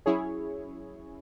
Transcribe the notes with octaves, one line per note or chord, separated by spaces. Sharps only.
F#3 C#4 E4 G#4 C#5